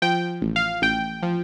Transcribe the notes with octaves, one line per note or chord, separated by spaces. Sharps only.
F3 G5
A1
F5
A1 G5
F3